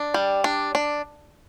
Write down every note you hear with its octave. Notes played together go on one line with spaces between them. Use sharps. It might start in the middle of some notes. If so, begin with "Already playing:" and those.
Already playing: D4
G3
D4
D4